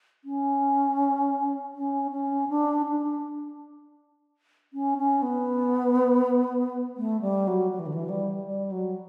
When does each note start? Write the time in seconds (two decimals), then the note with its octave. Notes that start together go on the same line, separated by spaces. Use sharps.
0.25 C#4
1.74 C#4
2.12 C#4
2.49 D4
2.86 D4
4.73 C#4
4.98 C#4
5.22 B3
6.97 A3
7.22 G3
7.47 F#3
7.72 F#3
7.79 E3
7.86 D3
7.94 E3
8.09 G3
8.47 G3
8.72 F#3